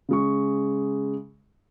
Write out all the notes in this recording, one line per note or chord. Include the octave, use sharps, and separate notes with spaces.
C#3 G#3 C#6